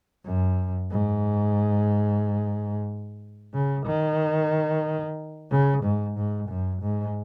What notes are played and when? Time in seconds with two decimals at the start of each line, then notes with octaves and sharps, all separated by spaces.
0.25 F#2
0.91 G#2
3.54 C#3
3.86 D#3
5.51 C#3
5.83 G#2
6.17 G#2
6.49 F#2
6.82 G#2